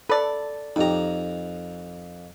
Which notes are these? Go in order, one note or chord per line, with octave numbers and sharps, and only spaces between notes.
A4 B4 D5
F2 D#4 G4 A#5